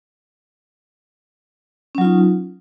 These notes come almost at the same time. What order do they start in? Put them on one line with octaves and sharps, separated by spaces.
C#4 F#3 F4 D#4